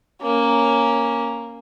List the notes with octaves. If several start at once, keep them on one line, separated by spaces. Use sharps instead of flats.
A#3 C#4